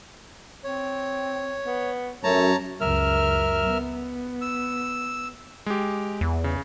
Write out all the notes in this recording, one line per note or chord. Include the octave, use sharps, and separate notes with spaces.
C4 C#5
B3
F#2 A3 C#5 A5 A#5
C#2 F#2 A#4 E5 F6
B3
E6
G#3 G4
E2
C#3